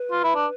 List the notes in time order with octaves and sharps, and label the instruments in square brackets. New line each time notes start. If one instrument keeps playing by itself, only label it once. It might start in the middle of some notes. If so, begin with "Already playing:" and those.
Already playing: [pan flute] B4
[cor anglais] F4
E4
D4